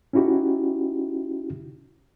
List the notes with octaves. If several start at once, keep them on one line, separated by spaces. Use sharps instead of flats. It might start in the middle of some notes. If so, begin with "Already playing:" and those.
C#4 D#4 E4 F#4 G4